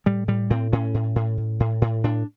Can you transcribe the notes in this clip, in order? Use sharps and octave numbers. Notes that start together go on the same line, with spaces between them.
A2 G3
A2 G3
A2 C4
A2 C#4
A2
A2
A2
A2
A2
A2 D4